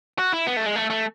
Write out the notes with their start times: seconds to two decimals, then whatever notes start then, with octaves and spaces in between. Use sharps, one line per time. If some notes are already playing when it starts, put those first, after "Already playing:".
0.18 F#4
0.33 E4
0.47 B3
0.57 A3
0.66 G#3
0.76 A3
0.90 A3